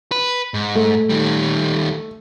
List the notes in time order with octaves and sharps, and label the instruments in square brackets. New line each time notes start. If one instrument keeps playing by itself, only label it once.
[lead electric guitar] B4
G#2
[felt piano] A3
[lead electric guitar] D#3 G3